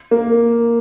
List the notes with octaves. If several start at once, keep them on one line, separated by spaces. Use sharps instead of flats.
A#3